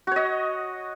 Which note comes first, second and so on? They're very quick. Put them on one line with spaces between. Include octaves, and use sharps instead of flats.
F#4 C#5 D#5